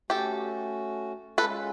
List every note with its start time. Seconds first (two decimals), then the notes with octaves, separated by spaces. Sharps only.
0.10 A3 C#4 F#4 G4 A4
1.38 G#3 C#4 F4 A4 B4